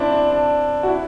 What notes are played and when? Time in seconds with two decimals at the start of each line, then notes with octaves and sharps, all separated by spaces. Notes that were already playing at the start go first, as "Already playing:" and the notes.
Already playing: C4 D4 E4
0.12 D4
0.31 D4
0.83 F#4
0.87 E4